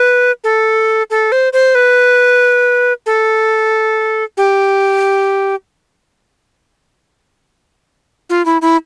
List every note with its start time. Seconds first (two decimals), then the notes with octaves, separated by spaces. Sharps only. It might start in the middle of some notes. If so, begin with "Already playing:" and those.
Already playing: B4
0.44 A4
1.10 A4
1.32 C5
1.53 C5
1.75 B4
3.06 A4
4.37 G4
8.30 F4
8.45 E4
8.62 E4